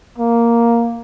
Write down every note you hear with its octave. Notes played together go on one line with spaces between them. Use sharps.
A#3